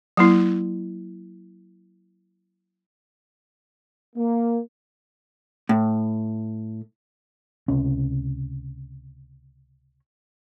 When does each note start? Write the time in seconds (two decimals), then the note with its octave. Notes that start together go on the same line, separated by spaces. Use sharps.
0.17 F#3 A#3 E4
4.16 A#3
5.69 A2
7.68 C#2 C3 C#4